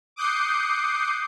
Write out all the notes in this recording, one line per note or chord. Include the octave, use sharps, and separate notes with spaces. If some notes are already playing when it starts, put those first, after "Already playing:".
D6 D#6 F#6 G6 C7 C#7